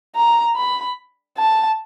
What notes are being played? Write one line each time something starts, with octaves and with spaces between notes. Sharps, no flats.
A#5
B5
A5